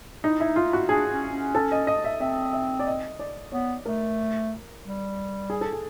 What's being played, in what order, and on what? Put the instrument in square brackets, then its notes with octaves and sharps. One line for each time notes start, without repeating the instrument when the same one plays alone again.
[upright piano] D#4 [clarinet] E4
[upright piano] E4
[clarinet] D#4
[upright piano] F4
[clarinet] E4
[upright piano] F#4
[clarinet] D4 [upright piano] G#4
[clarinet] C#4
C#4
[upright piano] A4
D#5
D#5
E5
[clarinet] C4 [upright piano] E5
[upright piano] E5
D5
D#5
D5
[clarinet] B3 [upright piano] C#5
[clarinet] A3 [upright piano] A#4
[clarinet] G3
[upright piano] G#4
A4
G#4